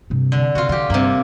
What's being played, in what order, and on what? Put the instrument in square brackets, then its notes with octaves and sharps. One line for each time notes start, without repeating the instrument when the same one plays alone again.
[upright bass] G2 C3
[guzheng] D3
[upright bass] C3 [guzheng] F4 F#4
[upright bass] E3 [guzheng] F4 G4
[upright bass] G2 [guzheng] C3 A#3